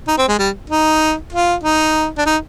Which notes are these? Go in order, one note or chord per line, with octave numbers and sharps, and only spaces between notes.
D#4
C4
G#3
G3
D#4
F4
D#4
D4
D#4